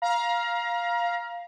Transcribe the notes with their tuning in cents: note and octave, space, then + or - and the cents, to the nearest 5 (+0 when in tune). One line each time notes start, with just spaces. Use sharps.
F5 +0 A#5 +30